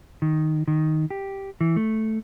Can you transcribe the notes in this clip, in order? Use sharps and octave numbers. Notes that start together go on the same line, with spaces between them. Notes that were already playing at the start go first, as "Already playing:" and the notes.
D#3
D#3
G4
E3
A3